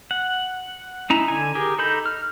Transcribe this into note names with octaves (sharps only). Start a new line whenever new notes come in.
F#5
C#4 D#4 E4 A#5
D3 G#5
G4 G#4 A#4
D#4 A4 D#5 B5 G6
F6